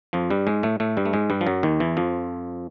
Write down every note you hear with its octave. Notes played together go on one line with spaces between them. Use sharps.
F2 F3
G2 G3
G#2 G#3
A2 A3
A2 A3
G2 G3
A3
G#2 G#3
G2 G3
F3
F#2 F#3
D#2 D#3
E2 E3
F2 F3